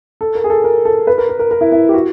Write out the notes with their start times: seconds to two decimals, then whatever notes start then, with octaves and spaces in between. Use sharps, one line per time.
0.21 A4
0.35 A#4
0.44 G#4
0.50 A4
0.64 A#4
0.85 A4
1.07 B4
1.18 A#4
1.29 A#4
1.39 A#4
1.51 A#4
1.61 E4
1.72 E4
1.89 G4
1.94 F#4